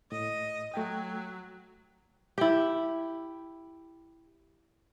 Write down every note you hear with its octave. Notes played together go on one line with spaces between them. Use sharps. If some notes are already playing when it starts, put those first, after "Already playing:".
A2 D#5
F#3 A3 G5
E4 G4